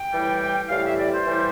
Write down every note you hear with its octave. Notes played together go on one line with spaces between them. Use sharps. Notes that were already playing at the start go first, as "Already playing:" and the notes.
Already playing: G5
A2 E3 G3
A2 E3 G3 F5
E5
D5
C5
A2 E3 G3